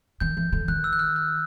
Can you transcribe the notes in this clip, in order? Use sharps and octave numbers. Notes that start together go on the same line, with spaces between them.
D#3 G6
E3
D3
D#3 F#6
E6
F#6
F6
F#6